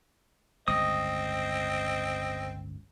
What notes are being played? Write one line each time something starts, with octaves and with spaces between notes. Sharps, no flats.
G1 C#2 A2 C4 D#5 D#6